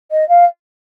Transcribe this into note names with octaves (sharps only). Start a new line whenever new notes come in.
D#5
F5